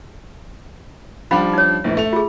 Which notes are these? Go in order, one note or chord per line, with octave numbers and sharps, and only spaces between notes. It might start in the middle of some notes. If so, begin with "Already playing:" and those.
F3 G3 C#4 D4 F5 B5
D#4 C#5
A#1 A2 E3
A3 F7
F4 G#4